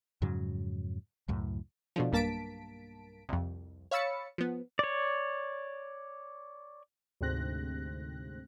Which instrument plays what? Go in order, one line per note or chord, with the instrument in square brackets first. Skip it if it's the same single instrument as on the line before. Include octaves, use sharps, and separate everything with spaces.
[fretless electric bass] F2 G#2 C#3 F#3
C#2 F#2 A2
[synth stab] B2 D3 F3
B1 G2 A#3 A5 B6 D7
C2 F2
C#5 F5 B5 E6 A6 C#7
F3 B3
[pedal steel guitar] C#5 D5
[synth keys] D2 G#2 C3 C4 F#6 A#6